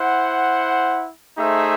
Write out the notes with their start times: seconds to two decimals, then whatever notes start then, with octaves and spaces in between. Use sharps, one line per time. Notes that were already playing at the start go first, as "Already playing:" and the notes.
Already playing: E4 C5 F#5
1.38 A3 D#4 G#4 C5 E5